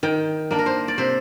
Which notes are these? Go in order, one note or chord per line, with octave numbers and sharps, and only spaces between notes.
D#3 G5
A#3 D4
A#4
C5
D5
C3 C5